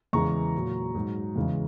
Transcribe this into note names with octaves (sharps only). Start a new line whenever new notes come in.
E2 C#3 E3 G#3 A#5 C#6
A#2 F#3
G#2 F#3
E2 C#3 E3 G#3